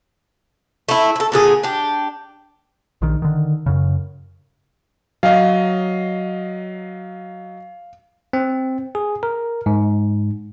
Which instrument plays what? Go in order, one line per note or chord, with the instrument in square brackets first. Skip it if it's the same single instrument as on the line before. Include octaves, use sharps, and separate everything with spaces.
[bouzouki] A3 E4
E4 A4
A#2 D3 G#4
D4 G4
[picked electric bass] A#1 D#3
D3 D#3
F#2 C#3
[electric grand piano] F#3 D#5 [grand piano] F5
[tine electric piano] C4
G#4
A#4
G#2